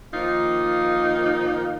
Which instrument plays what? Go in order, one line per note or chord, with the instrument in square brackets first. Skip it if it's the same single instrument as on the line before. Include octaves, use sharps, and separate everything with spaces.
[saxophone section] D#3 F3 A#3 D#4 F4